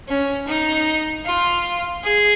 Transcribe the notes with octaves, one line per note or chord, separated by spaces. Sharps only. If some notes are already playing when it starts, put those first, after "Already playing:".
C#4
D#4
F4
G#4